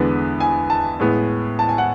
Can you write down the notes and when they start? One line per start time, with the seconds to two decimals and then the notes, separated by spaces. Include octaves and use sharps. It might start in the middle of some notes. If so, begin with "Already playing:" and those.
Already playing: E2 D3 G#3 B3 B4
0.40 G#5
0.70 A5
1.00 A2 G#3 B3
1.59 A5
1.69 G#5
1.78 F#5